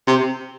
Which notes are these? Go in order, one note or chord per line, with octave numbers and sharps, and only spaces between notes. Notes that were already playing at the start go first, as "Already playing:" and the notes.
C3